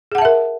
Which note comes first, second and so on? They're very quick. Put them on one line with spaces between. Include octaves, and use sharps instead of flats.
G#4 F#5 A5 E5 A#4